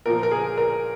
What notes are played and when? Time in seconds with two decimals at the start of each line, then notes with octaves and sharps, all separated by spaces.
0.06 A#2 F3 A#4
0.23 A#4
0.31 G#4
0.58 A#4